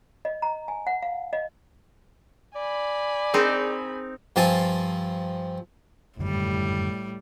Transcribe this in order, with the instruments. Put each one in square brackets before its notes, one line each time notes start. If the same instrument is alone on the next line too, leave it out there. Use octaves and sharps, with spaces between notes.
[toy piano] D#5
A#5
G#5
F#5
F5
D#5
[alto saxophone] D5 [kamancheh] G#5 B5
[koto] C4 D#4 [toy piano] G#4 A#4 D#5
[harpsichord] G2 F3 C4 G#5 A5
[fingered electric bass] F#2 D3 D#3 [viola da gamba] A2 G3